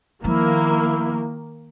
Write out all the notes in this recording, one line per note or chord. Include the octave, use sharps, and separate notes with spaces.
D#3 F3 A#3 B3 E4